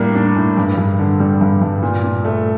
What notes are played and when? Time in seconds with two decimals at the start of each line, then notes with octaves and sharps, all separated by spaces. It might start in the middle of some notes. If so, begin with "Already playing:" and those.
Already playing: A2 G3 A#3 D4
0.15 D4
0.36 A2
0.57 G2
0.78 G2
0.99 D3
1.20 G3
1.41 G2
1.62 G2
1.82 A#2
2.03 A#2
2.25 A3